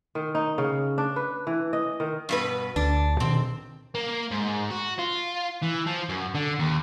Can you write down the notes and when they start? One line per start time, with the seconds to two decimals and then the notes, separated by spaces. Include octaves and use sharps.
0.15 D#3
0.35 D#4
0.58 C#3
0.98 D4
1.16 B4
1.47 E3
1.73 D#5
2.00 D#3
2.29 G2 B2 B4
2.76 D2 D4
3.20 B2 D3 D#3 C4
3.95 A#3
4.31 G#2
4.70 F#4
4.99 F4
5.63 E3
5.87 F3
6.09 F#2
6.35 D3
6.59 D#2